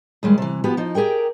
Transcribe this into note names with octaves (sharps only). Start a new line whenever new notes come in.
D#2 G3 G#3
C3 E3
F3 B3 F#4 G4
F3 D#4
G4 G#4 A#4 G5